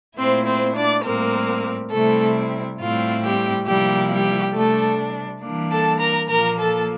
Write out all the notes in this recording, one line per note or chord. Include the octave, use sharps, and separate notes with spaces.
A#2 A3 C4 E4 C5
C4 C5
D4 D5
A2 G3 A#3 C4 A#4
C3 G3 A3 C4 E4 A4
A2 G3 C4 E4 F4
G3 G4
C3 F3 G3 A#3 E4 G4
G3 G4
C3 G3 A3 D4 A4
E3 G3 A#3 D4
A4 A5
A#4 A#5
A#2 F3 A#3 A#4 A#5
A4 A5